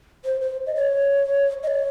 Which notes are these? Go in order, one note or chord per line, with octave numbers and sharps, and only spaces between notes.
C5
C5
D#5
C#5
D#5
C#5